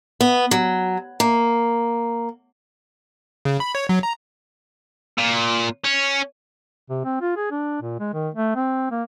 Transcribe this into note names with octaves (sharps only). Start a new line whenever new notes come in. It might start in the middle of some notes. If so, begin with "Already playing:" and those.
B3
F#3
A#3
C#3
B5
C#5
F#3
A#5
A#2
C#4
C3
C4
F4
G#4
D4
A#2
G#3
D#3
A3
C4
A#3